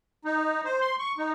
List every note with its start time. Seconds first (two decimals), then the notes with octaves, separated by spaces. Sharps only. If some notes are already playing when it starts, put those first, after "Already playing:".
0.25 D#4
0.65 C5
0.81 C6
0.99 C#6
1.18 D#4